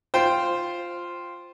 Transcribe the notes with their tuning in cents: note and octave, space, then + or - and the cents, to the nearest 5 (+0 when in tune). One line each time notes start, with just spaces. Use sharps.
F4 +0 C5 +0 G5 +0